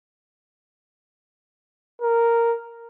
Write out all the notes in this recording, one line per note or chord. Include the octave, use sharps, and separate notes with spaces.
A#4